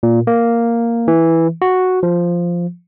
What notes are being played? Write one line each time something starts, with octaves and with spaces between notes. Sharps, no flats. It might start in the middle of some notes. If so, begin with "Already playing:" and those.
A#2
A#3
E3
F#4
F3